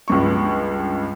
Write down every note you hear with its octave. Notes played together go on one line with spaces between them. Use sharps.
C#2 G2 C#6